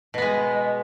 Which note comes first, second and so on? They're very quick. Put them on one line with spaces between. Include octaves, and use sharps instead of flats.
B2 B3 G#3